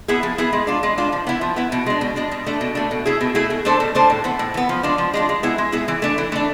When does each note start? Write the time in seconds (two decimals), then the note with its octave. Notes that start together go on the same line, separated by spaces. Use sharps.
0.08 B3 E4 G#4
0.23 F3
0.38 B3 E4 G#4
0.53 G#3
0.67 D4 F4
0.83 G#3
0.98 D4 F4
1.12 F3
1.27 B3 E4
1.41 F3
1.56 B3 E4
1.72 B2
1.86 G#3 D4
2.01 B2
2.16 G#3 D4
2.31 B2
2.46 A3 D4
2.61 B2
2.75 A3 D4
2.91 B2
3.06 A3 E4 G#4
3.21 B2
3.35 A3 E4 G#4
3.50 B2
3.65 A3 D4 A4 C5
3.80 B2
3.95 A3 D4 A4 C5
4.10 A2
4.24 E3 B3
4.39 A2
4.54 E3 B3
4.69 F3
4.83 G#3 D4 F4
4.98 F3
5.13 G#3 D4 F4
5.29 G#3
5.43 B3 E4 G#4
5.58 G#3
5.72 B3 E4 G#4
5.88 E3
6.02 A3 D4
6.18 E3
6.32 A3 D4